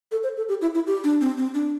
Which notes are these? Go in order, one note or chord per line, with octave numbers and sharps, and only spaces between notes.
A4
C5
A4
G4
E4
E4
G4
D4
C4
C4
D4